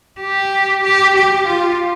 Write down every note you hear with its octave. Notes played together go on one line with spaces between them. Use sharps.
G4
G4
G4
F4